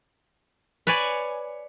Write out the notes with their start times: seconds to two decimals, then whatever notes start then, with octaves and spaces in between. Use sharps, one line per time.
0.87 B4 C#5 D5 G#5